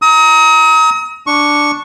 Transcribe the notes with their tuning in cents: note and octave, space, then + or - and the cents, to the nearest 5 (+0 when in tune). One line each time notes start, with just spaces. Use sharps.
A#5 +0 D#6 +40
D4 +0 C#6 +0